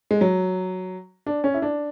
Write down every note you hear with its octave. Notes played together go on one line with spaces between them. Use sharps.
G#3
F#3
D4
C#4
E4
D4